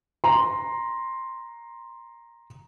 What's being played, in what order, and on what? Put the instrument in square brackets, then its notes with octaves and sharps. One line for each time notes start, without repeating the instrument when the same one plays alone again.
[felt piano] A#5 C6